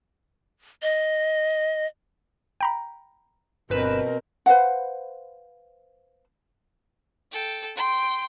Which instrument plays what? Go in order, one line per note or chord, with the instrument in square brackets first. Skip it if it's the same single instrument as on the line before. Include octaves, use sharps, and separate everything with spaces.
[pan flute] D#5
[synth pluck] G5 A#5 B5
[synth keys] G1 B4 E7 [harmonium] B2 [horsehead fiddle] C4 A#4
[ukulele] B4 C5 F5 F#5
[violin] A4 G5
G5 C6